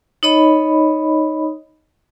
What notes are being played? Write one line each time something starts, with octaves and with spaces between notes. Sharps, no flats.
D#4 C#5 D#5 B5